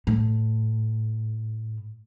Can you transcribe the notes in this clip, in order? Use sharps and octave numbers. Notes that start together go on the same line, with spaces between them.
A2